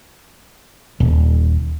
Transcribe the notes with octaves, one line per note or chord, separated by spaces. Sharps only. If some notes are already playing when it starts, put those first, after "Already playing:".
D#1